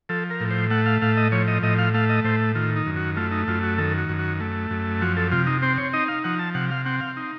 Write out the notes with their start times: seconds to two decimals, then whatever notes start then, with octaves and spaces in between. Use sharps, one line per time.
0.09 F3 A4
0.30 A#4
0.40 A2
0.51 C5
0.71 A3 F#5
0.86 F5
1.02 A2 F5
1.17 D#5
1.32 F3 C#5
1.48 D#5
1.63 A2 D#5
1.79 F5
1.94 A3 F5
2.09 D#5
2.24 A2 C5
2.55 D#3 F4
2.76 D#4
2.86 F#2
2.96 F#4
3.17 A3 F4
3.32 D#4
3.48 F#2 F4
3.63 F#4
3.78 D#3 A4
3.98 F#4
4.09 F#2
4.19 F#4
4.40 A3
4.71 F#2
5.01 F3 F#4
5.17 A4
5.32 C3 F4
5.47 D#4
5.62 C4 C5
5.78 C#5
5.93 D#4 D#5
6.08 F5
6.24 F3 F#5
6.39 A5
6.55 C3 F#5
6.71 F5
6.85 C4 F#5
7.01 F5
7.17 D#4